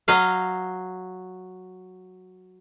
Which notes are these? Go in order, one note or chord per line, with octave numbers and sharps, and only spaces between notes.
F#3 D#5 F5